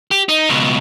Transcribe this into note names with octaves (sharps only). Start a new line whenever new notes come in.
G4
D#4
C#2 B2